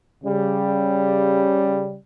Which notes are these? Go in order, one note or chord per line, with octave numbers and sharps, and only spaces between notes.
C#3 G3